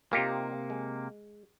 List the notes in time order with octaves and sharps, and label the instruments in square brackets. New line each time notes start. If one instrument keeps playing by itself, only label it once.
[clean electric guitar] C3 A#3 [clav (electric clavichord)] D#4 F4 G4
[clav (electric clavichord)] G#3